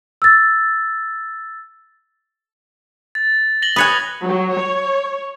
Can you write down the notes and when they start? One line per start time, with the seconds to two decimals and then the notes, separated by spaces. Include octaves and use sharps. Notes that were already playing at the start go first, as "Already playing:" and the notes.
0.22 E6 A6
3.15 A6
3.62 A#6 F#7 G7
3.76 B4 C#5 G#5 D#6 F#6
4.24 F#3
4.59 C#5